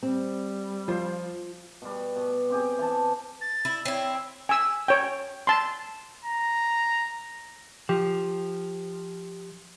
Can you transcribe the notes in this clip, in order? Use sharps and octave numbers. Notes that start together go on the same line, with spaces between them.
G3 C4
F3 F4 C5
B2 G3
B2
C4 G4 G#4
E3 A5
A6
E4
C4 E4 C#5
G#5 E6
C#5 G5
A5 C6
A#5
F3 G4